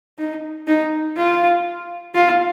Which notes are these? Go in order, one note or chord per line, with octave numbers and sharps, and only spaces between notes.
D#4
D#4
F4
F4